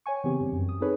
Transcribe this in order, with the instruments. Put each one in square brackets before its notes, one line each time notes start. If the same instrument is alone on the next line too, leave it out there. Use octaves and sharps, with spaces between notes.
[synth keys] C#5 G5 G#5 C#6
C#3 E3 B3 C4 G4
G2
F#2
D#6
C4 D#4 G#4 A4 B4 C#5